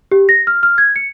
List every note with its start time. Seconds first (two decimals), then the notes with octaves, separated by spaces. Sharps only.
0.11 G4
0.29 A#6
0.47 F6
0.63 F6
0.78 G#6
0.96 C#7